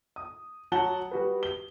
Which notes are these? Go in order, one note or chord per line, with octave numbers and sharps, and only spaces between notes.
D#6
F#3 F#4 F#5 A5 G7
G3 F#4 B4
G7